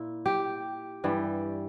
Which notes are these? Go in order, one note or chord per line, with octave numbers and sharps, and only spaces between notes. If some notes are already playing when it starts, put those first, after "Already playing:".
Already playing: A#2 E4
G4
G2 E3 G3